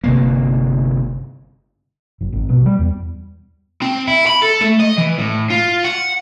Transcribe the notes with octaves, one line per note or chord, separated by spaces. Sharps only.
G1 C3 A#3
F#1
G#1
B2
G3
E2
C4
E4
B5
A4
A3
D#5
E3
A2
F4
F#5